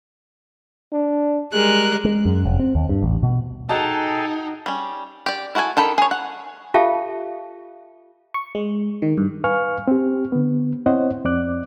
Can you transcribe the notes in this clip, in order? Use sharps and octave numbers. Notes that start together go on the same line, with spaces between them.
D4
G3 G#3 G#4 A#4 F#6
G#3
F#2
F1
C4
D#2
G2
A1
B2
D#4 F#4 G#4 A4 D#5 G5 A5 A#5
G3 C#4
G4 D5
E4 F#4 A4 F5 G#5
D#3 A4 G5 B5
G#4 C#5
F#5
F4 G4 A4 E5 F5 A5
C#6
G#3
D#3
G2
B4 F5 G#5 C#6 F6
C4 G4
D3 B3
C4 E4 C5 C#5 D#5 F#5
F2 C4 D5 D6 F#6